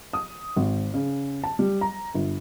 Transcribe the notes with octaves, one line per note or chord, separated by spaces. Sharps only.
D#6
G#1
C#3
A5
G3
A#5
G1